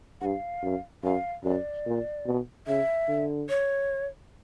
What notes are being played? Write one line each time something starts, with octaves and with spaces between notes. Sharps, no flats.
G2 F5 F#5
F#2
F#2 F5
F#2 D5
A#2
B2
C#3 E5
D3
C#5